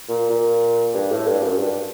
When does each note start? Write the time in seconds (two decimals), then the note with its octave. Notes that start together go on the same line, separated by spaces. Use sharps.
0.09 A#2
0.30 A#2
0.95 G2
1.11 A2
1.27 G2
1.44 F#2
1.59 G2